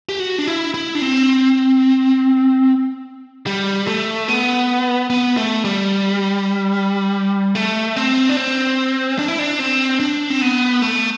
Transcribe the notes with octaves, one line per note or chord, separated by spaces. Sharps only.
G4
F#4
D4
E4
E4
D4
C4
G3
A3
B3
B3
A3
G3
A3
C4
D4
C4
D4
E4
D4
C4
D4
C4
B3
A3